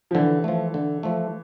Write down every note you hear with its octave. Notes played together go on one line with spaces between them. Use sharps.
F3
D3 E3
F3 A3
D3
F3 A3